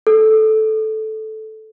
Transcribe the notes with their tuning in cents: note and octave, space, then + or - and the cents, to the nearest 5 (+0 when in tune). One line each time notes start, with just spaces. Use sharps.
A4 -10